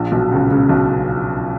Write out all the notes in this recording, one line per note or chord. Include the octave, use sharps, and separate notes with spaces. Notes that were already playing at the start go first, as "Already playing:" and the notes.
Already playing: A#1 A#2
B1 B2
C#2 C#3
C#2 C#3
B1 B2